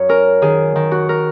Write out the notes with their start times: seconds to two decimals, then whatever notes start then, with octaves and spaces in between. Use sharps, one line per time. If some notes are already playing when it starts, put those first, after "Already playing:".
Already playing: F#2 C#5
0.09 C#4 A#4
0.42 D#3 G#4
0.76 D#3
0.91 F#4
1.09 A#4